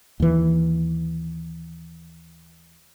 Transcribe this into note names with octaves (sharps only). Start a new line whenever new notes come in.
D#2 E3